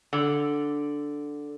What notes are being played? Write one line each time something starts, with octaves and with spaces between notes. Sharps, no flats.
D3